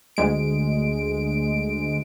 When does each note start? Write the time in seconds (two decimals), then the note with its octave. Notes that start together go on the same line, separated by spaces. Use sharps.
0.17 D2 G#3 D7